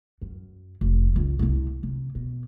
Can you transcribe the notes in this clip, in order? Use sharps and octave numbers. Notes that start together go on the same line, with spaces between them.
F#2
F1
C#2 D#3
C2 C3
C3
B2